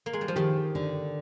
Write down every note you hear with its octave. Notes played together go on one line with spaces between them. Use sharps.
A#3
G#3
G3
F3
D#3 G4
D3